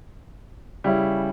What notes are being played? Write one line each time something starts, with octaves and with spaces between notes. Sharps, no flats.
C#3 G3 C#4 E4